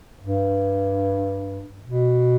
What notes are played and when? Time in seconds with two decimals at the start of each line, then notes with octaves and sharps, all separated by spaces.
0.21 G2
1.86 B2